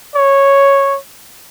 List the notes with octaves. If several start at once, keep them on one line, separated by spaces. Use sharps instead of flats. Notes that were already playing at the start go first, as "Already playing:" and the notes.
C#5